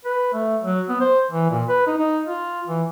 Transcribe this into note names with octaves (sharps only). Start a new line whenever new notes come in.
B4
A3
F#3
B3
C5
E3
A#2
B4
D#4
D#4
F4
E3